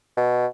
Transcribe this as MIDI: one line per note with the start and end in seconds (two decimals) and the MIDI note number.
0.17 0.47 47